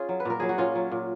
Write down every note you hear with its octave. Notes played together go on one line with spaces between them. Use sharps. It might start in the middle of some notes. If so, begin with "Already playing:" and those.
Already playing: C#4 F4 G#4
F#3
B4
A#2 A#4
F#3 G#4
F#4
A#2 C#4 F4
F#3
A#2